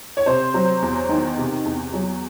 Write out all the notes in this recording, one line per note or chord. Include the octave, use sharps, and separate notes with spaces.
C#5
C3 C5
F#3
E2
D#3
C3
E2
F#3